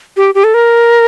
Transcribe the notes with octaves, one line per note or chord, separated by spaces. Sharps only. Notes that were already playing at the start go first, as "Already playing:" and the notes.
G4
G4
A4
A#4